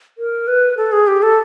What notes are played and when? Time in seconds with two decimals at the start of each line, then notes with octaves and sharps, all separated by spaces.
0.18 A#4
0.48 B4
0.77 A4
0.92 G#4
1.07 G4
1.22 A4